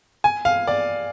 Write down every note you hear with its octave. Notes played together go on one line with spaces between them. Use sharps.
G#5
F5
D5